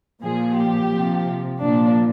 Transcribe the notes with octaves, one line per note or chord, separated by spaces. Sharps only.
A#2 F3 G#4
G4
C3 F3
A#2 F3 D4